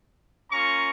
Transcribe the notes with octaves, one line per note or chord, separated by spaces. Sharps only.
A#3 C#4 F4 A#5 C#6